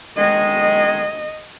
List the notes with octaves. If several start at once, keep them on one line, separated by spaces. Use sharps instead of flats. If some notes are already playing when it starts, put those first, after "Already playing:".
D#3 G#3 G#4 D#5